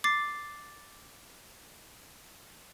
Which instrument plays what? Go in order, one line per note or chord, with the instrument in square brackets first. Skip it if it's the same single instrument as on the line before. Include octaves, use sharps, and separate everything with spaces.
[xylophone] D6 A6 C7